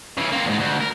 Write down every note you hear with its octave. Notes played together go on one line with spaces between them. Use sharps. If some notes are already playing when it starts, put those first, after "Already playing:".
C#3 E3
A#3 C4
E2 G#2
D2
A#4